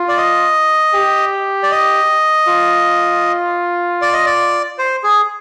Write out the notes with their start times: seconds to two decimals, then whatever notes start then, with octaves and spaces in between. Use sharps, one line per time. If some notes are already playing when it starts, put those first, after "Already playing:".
Already playing: F4
0.08 D5
0.18 D#5
0.94 G4
1.63 D5
1.71 D#5
2.48 F4
4.02 D5
4.13 D#5
4.26 D5
4.78 C5
5.04 G#4